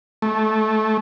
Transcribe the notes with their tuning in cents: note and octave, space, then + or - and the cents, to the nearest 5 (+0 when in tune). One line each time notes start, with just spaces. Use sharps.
A3 -15